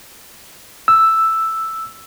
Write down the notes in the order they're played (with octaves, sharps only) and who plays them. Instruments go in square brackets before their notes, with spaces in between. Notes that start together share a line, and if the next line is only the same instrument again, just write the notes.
[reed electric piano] E6